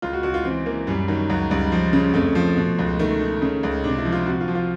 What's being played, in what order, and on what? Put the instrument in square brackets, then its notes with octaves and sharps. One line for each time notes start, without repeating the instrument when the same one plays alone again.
[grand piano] C#2 F4
F#4
C#2 F#4
F4
E3 C4
E3 A#3
F#2 G3
D#3 F#3
C#2 F#3
C#2 G3
F3
C#3
F2 A3
F3
B2
C#2
D#3 A3
D#3
C#3
C#2
C3 D4
E4
F3
F4
C3 F#4
F4
F3
F4